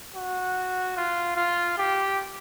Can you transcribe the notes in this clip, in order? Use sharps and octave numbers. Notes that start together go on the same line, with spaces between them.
F#4
F4
F4
G4